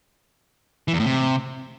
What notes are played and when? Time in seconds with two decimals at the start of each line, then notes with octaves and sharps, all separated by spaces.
0.88 E3
0.94 E2
1.00 A2
1.06 C3